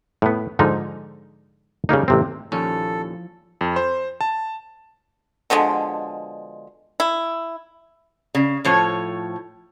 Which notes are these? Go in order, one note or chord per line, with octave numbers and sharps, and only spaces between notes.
A2 B3
G#2 D3 F3 D#4
C#3 G3 A#3 D#4
A1 C3 C4
D#2 A#2 F3 A#3 C#4 E4 A4
F2
C5
A5
B2 D3 F3 G#3
E4
C#3
A2 F3 C#5